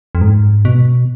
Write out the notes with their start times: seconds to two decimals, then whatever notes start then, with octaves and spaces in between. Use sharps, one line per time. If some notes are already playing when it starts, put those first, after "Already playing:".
0.15 F2
0.21 G#2
0.65 B2